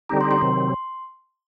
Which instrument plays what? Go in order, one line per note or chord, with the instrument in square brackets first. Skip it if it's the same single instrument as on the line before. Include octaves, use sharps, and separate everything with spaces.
[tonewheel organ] D3 G3 C4 D#4 G4 [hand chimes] A#5
[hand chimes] C6
C6
[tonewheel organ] C3 D#3 F#3 C4